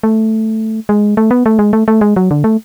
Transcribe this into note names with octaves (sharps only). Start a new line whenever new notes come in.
A3
G#3
A3
B3
A3
G#3
A3
A3
G#3
F#3
D3
A3